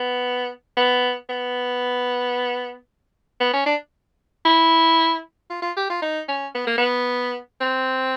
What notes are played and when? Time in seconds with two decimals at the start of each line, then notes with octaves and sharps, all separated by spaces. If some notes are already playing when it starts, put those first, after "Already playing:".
Already playing: B3
0.77 B3
1.29 B3
3.40 B3
3.53 C#4
3.66 D4
4.45 E4
5.50 F4
5.62 F4
5.77 G4
5.90 F4
6.02 D#4
6.28 C#4
6.55 B3
6.67 A#3
6.78 B3
7.61 C4